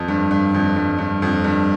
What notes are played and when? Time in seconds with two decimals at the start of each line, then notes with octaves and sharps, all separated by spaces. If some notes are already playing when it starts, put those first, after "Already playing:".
Already playing: F2
0.08 G2
0.31 G2
0.54 F2
0.76 G2
0.98 G2
1.22 F2
1.44 G2